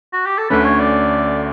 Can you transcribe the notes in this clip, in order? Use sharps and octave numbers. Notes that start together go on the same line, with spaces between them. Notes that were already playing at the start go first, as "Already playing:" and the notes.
F#4
G4
A4
D2 D3 A3 C#4 B4
C#5
D5